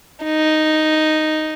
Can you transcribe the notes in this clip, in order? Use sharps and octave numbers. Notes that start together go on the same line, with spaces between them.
D#4